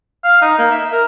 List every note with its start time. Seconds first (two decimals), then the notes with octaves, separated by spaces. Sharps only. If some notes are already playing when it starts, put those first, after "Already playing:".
0.24 F5
0.42 D#4
0.58 A#3
0.71 E5
0.92 A#4